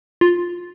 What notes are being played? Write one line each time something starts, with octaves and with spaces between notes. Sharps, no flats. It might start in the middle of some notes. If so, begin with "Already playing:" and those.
F4